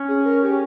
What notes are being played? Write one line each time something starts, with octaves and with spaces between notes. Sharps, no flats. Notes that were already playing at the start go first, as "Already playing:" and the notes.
Already playing: C#4
G#4
A#4
G4